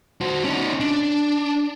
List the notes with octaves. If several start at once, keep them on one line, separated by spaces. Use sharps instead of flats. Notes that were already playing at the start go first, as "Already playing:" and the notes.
F#4 C5
C#4 D#4
D4